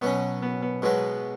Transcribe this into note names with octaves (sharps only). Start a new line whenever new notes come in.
B2 F#3 B3 C#4
B3
B3
B2 F#3 G#3 B3